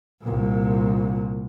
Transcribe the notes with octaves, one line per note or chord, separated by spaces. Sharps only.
C2 A#2